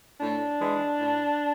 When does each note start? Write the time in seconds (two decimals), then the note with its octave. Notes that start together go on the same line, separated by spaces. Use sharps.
0.21 A2 D4
0.60 E3 G#3
0.99 A2